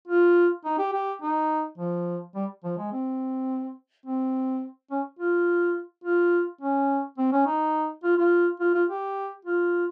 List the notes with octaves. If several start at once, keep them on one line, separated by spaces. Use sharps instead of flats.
F4
D#4
G4
G4
D#4
F3
G3
F3
G#3
C4
C4
C#4
F4
F4
C#4
C4
C#4
D#4
F4
F4
F4
F4
G4
F4